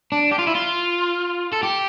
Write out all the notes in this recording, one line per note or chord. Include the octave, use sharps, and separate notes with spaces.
D4
G4
F4
E4
F4
A4
G4